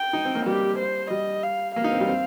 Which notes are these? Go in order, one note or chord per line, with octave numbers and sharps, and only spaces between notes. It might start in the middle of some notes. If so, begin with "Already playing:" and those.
Already playing: G5
D#4
C4
A#3
G3 G4
C5
G3 D#5
F5
A#3 F5
D#4
C4
G3
C4